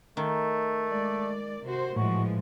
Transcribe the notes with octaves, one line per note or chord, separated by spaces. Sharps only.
D#3 A3
G#3 D5
C3 F#4 C5
A2 E3 F3 G#3 F#4